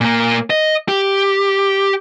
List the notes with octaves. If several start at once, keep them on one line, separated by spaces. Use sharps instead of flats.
A#2 A#3
D#5
G4